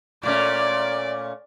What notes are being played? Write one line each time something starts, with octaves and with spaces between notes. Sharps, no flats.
A#2 A3 C#4 D5